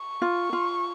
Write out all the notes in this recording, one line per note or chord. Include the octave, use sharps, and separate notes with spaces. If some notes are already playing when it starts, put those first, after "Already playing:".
Already playing: C#6
F4
F4